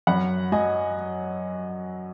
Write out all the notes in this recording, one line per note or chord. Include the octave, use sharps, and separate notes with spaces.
F#2 F#5 B5
F#3 D#5 G#5